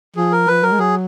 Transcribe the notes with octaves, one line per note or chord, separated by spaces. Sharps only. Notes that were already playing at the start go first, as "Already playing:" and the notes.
F3 G#4
A#4
F3 B4
F#3 A#4
G#3
F#3 G#4